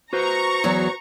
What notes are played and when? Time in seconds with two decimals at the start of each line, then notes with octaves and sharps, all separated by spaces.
0.13 F#4 B4 C5 A#5 C#6
0.64 E2 F#3